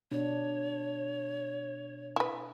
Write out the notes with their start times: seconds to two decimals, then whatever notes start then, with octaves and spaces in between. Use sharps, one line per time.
0.12 B2 D4 C#5
2.16 E4 B4